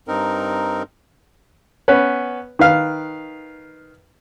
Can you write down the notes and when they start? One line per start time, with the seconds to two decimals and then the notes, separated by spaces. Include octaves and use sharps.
0.08 G2 C4 D#4 A#4
1.88 B3 C#4 B4
2.59 D#3 B4 F5